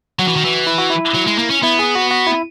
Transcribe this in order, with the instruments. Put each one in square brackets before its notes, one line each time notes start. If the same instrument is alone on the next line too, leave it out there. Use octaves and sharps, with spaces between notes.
[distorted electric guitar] F#3 [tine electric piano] F#4
[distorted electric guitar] E3
D#3
E3
[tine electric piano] E4
F#4
E4
[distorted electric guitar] F#3
G#3
A#3
C#4
[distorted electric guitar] B3 [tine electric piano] E4
[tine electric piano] G#4
F#4
F#4
E4